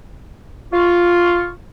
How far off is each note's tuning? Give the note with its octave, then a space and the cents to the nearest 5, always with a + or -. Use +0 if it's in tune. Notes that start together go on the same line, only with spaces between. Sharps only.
F4 +0 C#6 +0